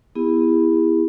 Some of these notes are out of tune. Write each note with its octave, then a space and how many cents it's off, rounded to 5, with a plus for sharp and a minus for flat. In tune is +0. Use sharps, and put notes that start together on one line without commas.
B3 +0 E4 +0 G#4 -45